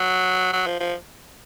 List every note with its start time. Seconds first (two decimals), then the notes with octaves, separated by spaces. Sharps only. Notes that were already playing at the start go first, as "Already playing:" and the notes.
Already playing: F#3
0.53 F#3
0.66 F3
0.80 F3